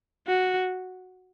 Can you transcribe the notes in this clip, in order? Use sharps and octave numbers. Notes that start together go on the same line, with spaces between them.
F#4